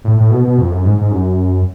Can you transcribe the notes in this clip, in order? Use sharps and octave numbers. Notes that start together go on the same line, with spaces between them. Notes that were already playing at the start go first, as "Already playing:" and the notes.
A2
A2
B2
B2
F2
F#2
G#2
G#2
F#2